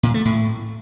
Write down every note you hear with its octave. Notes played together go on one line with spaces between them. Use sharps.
A#2
A3
A2